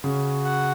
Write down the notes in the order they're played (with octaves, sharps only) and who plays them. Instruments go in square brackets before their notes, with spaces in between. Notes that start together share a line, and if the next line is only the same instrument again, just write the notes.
[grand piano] C#3 [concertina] F#4
[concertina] F#5